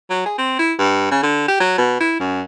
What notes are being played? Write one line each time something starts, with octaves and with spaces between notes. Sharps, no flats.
F#3
G#4
C4
E4
G2
C#3
D3
G4
F#3
B2
E4
F#2